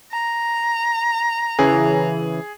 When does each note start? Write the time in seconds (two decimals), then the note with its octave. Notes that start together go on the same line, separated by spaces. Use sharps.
0.12 A#5
1.59 C#3 E3 C#4 G#4